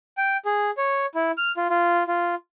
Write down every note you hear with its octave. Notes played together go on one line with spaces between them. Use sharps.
G5
G#4
C#5
E4
F6
F4
F4
F4